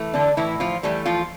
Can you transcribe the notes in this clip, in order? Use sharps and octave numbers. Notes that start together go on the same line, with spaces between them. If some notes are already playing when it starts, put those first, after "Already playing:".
Already playing: E3 A3
D3 D4
A2 E3 E4
F3 F4
E3 G3 A3 G4
F3 F4